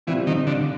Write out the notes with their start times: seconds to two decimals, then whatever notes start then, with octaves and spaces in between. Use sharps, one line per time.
0.07 A#2 E3 G3 C4
0.27 D#3
0.47 D3